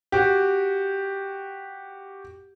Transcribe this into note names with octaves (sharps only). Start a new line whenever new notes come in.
F#4 G4